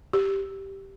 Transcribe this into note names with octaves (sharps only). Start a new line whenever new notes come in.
G4